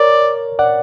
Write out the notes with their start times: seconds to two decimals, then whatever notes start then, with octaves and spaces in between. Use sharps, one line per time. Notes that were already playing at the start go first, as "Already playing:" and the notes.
Already playing: A#4 C#5 D5
0.59 D5 F#5